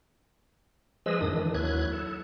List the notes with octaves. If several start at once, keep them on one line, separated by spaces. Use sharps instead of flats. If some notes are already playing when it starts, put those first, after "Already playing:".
F3 G#3 G#4 B4 D#5 E6
F#2 A2 D#3 D4 D#6
D#3 E3 D4
D#2 F#3 E4 F#6 G#6
A4